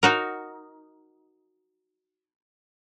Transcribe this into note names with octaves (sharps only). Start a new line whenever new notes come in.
D#4 F#4 A#4